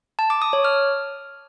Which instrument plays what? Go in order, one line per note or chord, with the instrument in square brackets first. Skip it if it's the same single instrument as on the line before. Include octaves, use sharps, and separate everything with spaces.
[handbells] A5
D6
D#6
C#5
F6